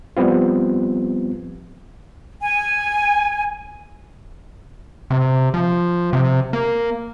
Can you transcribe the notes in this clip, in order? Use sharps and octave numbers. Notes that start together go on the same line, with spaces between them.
F3 G3 B3 C4 F4
G#5
C3
F3
C3
A#3